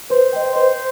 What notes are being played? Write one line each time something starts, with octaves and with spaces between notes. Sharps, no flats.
B4 C5
D#5 G5
B4 C5